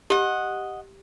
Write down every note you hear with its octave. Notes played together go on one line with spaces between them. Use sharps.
G4 D#5 F#5